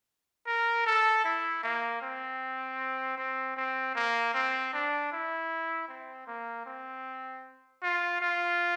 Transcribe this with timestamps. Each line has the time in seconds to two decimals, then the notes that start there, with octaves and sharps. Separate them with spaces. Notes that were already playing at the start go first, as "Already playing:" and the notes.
0.47 A#4
0.86 A4
1.24 E4
1.63 A#3
2.02 C4
3.18 C4
3.57 C4
3.95 A#3
4.34 C4
4.73 D4
5.12 E4
5.88 C4
6.27 A#3
6.66 C4
7.83 F4
8.21 F4